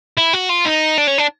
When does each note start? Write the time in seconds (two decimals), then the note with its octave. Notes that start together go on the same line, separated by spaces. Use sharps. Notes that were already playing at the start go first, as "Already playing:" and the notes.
0.18 E4
0.34 F#4
0.50 F4
0.66 D#4
0.98 D4
1.08 C#4
1.18 D4